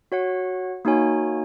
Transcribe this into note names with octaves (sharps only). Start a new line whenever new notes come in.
F#4 C#5 F#5
A#3 D#4 F#4 C#5 G#5